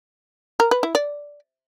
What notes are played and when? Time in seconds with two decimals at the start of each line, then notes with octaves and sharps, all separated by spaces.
0.60 A#4
0.71 B4
0.83 E4
0.95 D5